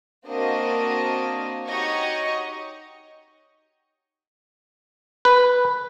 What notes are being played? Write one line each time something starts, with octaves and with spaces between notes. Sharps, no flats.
A#3 C4 D4 F#4 A#4 D#5
D#4 F#4 G4 C#5 D#5 C#6
B4